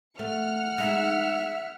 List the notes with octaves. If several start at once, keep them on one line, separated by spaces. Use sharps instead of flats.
A3 F#5 F6 C#7
G#3 D#4 E5